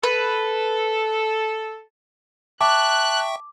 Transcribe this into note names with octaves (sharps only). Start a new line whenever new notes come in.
A4 B4
E5 G5 A5 C#6 D6 F#6